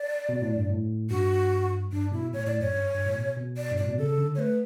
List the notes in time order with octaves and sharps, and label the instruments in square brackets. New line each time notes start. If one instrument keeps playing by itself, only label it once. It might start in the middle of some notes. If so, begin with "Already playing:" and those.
Already playing: [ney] D5
[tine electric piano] B2
A2
G2
A2
[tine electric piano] G2 [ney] F#4
[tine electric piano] G2 [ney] D4
[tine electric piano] B2 [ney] E4
[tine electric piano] A2 [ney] C#5
[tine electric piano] A2 [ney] D5
[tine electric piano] F#2 [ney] C#5
[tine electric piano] G2
G2
A2
B2
B2
[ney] D5
[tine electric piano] G2
[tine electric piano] A2 [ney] D5
[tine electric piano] B2
[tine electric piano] C#3 [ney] A4
[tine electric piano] D3
[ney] C#5
[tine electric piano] A3 [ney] B4